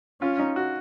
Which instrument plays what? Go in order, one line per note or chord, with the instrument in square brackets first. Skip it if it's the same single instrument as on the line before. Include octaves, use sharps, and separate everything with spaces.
[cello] C#4 [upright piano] F4
[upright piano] D#4
F#4